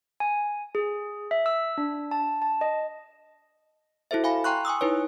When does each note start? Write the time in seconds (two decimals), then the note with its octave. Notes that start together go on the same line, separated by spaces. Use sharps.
0.20 G#5
0.75 G#4
1.31 E5
1.46 E6
1.78 D4
2.11 A5
2.42 A5
2.61 D#5
4.11 E4 F#4 A4 C5 E5
4.24 F5 G#5 B5
4.44 G5 A#5 C6 C#6 F#6
4.65 G#5 C#6 D#6 E6
4.81 D#4 E4 B4 C#5